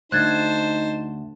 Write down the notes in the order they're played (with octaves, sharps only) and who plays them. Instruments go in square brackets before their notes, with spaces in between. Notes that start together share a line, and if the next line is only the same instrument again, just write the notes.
[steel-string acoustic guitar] D2 [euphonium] D#4 [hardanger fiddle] C5 A5 [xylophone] F#6 G#6 A6